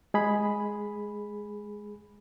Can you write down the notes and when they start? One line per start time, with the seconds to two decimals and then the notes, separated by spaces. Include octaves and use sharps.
0.14 G#3 G#4 B5